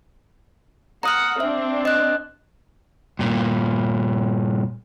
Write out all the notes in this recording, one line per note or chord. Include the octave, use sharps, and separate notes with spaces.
F#5 A#5 D#6 F6
C4 D4 E5
D#5 F#6
G2 A#2